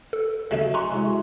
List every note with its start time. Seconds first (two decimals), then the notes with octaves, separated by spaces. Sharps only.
0.13 A4
0.51 C#3 F#3 A3 D#4
0.74 G#5 A#5 C6 C#6 F#6
0.92 G#3 E4 F#4